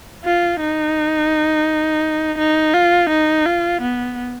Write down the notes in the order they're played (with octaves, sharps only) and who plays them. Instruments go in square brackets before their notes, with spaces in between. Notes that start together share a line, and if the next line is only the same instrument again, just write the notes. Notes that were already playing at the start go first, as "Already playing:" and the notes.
[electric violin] F4
D#4
D#4
F4
D#4
F4
B3